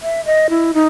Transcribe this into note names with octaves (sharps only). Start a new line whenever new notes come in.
E5
D#5
E4
D#4